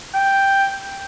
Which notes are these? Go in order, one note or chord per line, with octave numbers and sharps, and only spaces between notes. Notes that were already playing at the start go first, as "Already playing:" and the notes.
G5